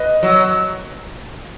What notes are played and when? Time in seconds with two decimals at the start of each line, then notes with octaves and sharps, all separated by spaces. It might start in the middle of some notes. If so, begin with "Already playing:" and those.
Already playing: B4 D#5
0.23 F#3